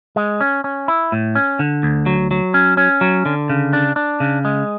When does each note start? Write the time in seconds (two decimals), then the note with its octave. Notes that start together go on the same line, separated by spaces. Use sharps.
0.16 G#3
0.41 C#4
0.64 C#4
0.88 E4
1.12 A2
1.35 C#4
1.59 D3
1.83 D2
2.06 F#3
2.31 F#3
2.54 C#4
2.77 C#4
3.01 F#3
3.26 D3
3.50 C#3
3.73 D4
3.96 D4
4.20 C#3
4.45 G#3